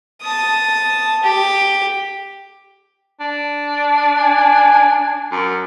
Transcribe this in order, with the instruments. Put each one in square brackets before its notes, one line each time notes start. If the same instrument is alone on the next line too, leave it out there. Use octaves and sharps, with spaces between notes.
[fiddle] A5 D#6
G4
[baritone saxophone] D4
[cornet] G#5
[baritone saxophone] F#2